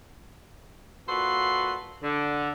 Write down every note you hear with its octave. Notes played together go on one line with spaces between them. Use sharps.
A#2 F#4 A4 B4 C6
D3